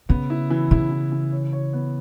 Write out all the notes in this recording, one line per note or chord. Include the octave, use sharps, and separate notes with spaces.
C#3 B3
E4
E3
C#3 E4
E3
E3
C#5
C#5
B3